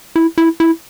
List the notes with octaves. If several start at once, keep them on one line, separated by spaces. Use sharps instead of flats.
E4
E4
E4